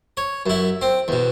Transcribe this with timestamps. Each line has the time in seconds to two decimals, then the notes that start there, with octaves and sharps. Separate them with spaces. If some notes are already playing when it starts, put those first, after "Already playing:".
0.17 C#5
0.46 F#2 E4
0.81 C4
1.08 E2 B2